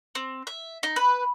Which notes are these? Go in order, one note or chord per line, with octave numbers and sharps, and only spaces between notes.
C4
E5
D#4
B4